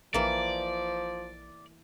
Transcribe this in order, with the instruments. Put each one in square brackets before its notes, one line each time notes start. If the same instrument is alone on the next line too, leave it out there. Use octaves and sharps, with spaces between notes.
[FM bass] A#1 [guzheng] E3 A#3 [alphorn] F3 [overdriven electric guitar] D5